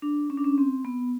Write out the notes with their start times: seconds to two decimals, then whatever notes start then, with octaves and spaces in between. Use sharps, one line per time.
0.02 D4
0.30 C#4
0.37 D4
0.44 C#4
0.58 C4
0.85 B3